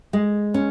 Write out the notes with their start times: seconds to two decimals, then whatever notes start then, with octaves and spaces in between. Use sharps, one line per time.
0.13 G#3
0.54 C#4